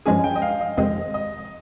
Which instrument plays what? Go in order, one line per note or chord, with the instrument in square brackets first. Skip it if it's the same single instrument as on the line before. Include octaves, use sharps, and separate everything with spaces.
[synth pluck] G2 F3 G#3 C#4 G#4 [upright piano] G#5
[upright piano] G5
D#5
F5
D#5
[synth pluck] F2 C3 D#3 G#3 C4 [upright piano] D#5
[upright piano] D#5